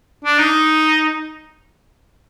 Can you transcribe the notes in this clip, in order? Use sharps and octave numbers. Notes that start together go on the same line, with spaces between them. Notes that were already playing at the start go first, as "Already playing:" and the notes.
D4
D#4